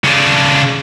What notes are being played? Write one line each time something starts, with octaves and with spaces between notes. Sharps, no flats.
C#3 D4